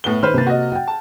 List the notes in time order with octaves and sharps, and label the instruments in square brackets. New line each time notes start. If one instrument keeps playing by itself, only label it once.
[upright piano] A2 B3 G7
[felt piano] D#3 [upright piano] B4 C5 F6
[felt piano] C3 A#3 A6
[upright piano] F#4 D#5
[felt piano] F#5 G5
[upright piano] A5